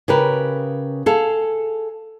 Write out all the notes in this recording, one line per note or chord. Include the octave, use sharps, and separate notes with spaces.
C#3 G4 A#4 B4
G#4 A4 F5